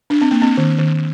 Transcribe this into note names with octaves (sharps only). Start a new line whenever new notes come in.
D4
C4
A#3
C4
D#3
D#3